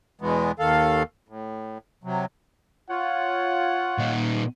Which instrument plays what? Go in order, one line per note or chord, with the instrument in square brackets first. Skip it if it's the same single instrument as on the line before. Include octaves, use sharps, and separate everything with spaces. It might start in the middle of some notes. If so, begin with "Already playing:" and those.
[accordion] E2 B2 E3 G#3 B3
D#2 D#3 A4 F5
A2
C3 F#3
[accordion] F4 C#5 [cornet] F#5
[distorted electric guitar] A#2 D#4